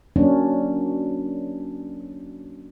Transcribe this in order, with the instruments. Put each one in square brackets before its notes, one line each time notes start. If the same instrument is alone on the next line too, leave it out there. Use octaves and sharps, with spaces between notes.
[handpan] F#3 A#3 C#4 D4